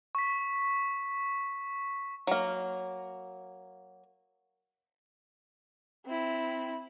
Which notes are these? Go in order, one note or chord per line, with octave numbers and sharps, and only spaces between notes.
C#6 B6
F#3 A#3
C4 E4